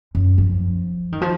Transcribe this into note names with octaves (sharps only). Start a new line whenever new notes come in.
F#2
F3
D#3
F3